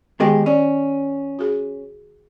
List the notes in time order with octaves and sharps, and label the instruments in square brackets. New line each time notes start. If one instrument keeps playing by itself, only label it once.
[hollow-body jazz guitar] E2 G#3 G4 [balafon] D#3
[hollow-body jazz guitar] C#4 [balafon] D5
[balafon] F#4 G#4